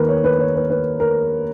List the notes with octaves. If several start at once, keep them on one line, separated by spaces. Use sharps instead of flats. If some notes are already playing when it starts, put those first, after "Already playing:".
Already playing: D#2 D#3 A#4 B4
C#5
B4
C#5
B4
B4
A#4